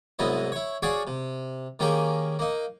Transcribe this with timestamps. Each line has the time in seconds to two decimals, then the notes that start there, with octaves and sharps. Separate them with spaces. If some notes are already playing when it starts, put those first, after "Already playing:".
0.19 C2 G#2 F#3 B3 E4 D#5
0.52 E4 C#5
0.82 F#4 G#4 C#5 D5 F5 F#5
1.07 C3
1.79 D#3 A#3 C#4 G4 G#4 A#4
2.39 A#3 D#4